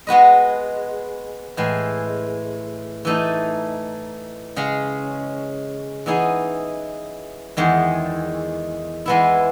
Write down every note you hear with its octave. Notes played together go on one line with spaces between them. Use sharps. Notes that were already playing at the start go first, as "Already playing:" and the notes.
G#3 B3 F#4 B4 D#5
A2 E3 G#3
E3 A3 D#4 A4
C#3 G#3 C#4
E3 B3 D#4 G#4
E2 D#3 G#3
E3 G#3 B3 E4